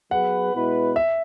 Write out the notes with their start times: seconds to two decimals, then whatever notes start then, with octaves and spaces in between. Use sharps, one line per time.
0.11 F#3 B3 G#4 B4 F#5
0.53 B2 G#3 E4 B4
0.96 E5